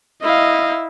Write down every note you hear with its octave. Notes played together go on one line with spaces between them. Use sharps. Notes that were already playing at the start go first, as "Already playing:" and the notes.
E4 D#5 F5